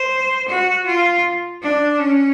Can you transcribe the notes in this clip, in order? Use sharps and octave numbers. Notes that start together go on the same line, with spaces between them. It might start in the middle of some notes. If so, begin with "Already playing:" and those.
Already playing: C5
F#4
F4
D4
C#4